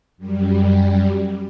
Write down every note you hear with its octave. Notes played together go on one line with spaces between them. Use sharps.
F#2 G3